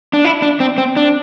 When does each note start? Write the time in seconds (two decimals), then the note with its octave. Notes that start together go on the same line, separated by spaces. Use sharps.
0.13 D4
0.25 E4
0.42 D4
0.60 C4
0.78 C4
0.97 D4